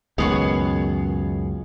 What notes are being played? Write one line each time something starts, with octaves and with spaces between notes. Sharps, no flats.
C#2 F#2 D#3 G#3 B3 G#4 C#5